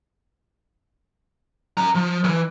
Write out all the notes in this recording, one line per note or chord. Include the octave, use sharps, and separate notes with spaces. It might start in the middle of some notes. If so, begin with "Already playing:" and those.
C#4 A#5
F3
D2 E3